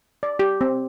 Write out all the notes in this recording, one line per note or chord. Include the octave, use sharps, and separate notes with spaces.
D5
G4
C4